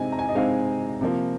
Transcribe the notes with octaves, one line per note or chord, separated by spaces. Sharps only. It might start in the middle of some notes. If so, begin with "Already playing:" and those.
Already playing: C3 G#3 C4 D#4 G#5
A#5
G#5
D#5
C3 G#3 C4 D#4 F5
C3 F3 A#3